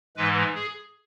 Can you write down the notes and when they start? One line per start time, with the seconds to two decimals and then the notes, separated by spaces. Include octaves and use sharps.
0.17 G#2 E3 G#3 B4
0.55 G#4